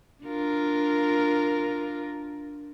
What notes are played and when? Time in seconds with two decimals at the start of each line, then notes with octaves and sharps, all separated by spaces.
0.24 D4 F4 A#4